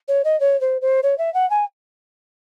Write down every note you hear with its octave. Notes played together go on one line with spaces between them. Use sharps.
C#5
D#5
C#5
C5
C5
C#5
E5
F#5
G#5